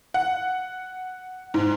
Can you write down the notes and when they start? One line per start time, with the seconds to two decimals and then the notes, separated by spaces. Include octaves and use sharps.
0.14 F#5
1.54 G#2